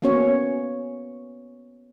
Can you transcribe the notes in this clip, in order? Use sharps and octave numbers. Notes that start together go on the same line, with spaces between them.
A#3 B3 C#4 F#4 C#5